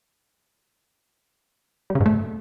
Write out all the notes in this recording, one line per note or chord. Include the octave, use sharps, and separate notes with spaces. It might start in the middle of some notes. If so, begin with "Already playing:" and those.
G3
C#3
G#2
A3